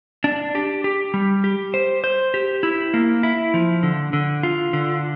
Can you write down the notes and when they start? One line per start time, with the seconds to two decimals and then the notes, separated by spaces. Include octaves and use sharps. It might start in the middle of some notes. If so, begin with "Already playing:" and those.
0.24 D4
0.55 G4
0.84 G4
1.14 G3
1.44 G4
1.74 C5
2.04 C5
2.34 G4
2.63 E4
2.94 A#3
3.23 E4
3.54 F3
3.83 D3
4.13 D3
4.43 F4
4.73 D3